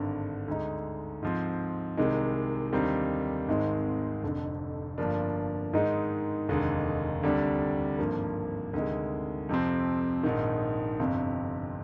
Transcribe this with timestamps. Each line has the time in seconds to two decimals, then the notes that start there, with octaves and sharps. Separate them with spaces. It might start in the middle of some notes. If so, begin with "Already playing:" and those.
Already playing: G#1 G2 D3
0.48 D2 D3 G#3 D#4
1.22 G#2 F3 C4
1.97 C2 C3 D#3 G#3
2.73 D#2 D3 G3 C4 D#4
3.48 G#1 G#2 D#3 G#3 C4
4.23 F1 F2 D3
4.98 G1 G2 F3 A#3 D4
5.73 G#2 D#3 G#3 D#4
6.48 F1 D#2 D3 G#3 D#4
7.23 D2 C3 G3 D4
7.99 G#1 G2 F3 A#3
8.73 D2 C3 D#3 G#3
9.49 F2 C3 F3 C4
10.23 A#1 G#2 D#3
10.99 G1 F2 C3